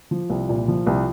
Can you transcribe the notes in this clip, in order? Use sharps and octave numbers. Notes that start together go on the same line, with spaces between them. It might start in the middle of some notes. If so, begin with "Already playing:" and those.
F3
C2
A#2
F3
C2